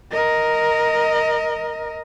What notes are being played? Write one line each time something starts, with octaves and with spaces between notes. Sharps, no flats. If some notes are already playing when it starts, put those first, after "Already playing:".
A#4 D#5